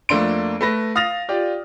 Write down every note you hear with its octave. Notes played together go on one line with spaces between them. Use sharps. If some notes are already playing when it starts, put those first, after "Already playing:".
F2 A3 A#3 D4 C6 D7
A3 B4 A#6
F5 D#6 F6 A6 A#6 F7
F4 G4 D5